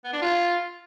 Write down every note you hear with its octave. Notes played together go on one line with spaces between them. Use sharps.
B3
D4
F4